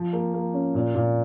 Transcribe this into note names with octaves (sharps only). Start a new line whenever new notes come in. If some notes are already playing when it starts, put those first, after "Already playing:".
Already playing: F3
A#3
A#3
C#4
A#2
A#2